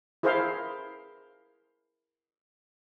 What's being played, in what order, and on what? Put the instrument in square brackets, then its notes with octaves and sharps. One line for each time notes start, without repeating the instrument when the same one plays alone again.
[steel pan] E4 G#4 A#4 C5 E5 F5